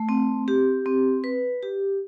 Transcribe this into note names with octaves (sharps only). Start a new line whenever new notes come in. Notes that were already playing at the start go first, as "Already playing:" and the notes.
Already playing: A3
C4
G4
C4
B4
G4